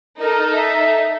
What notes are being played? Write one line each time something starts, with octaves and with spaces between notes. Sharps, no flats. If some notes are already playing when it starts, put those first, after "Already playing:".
D#4 A4 A#4
E5